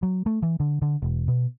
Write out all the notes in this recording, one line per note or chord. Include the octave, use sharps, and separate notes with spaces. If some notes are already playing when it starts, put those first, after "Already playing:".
F#3
A3
E3
D3
D3
E1
B2